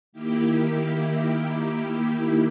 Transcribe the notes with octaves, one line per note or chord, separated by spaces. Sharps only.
D#3 A#3 E4 G4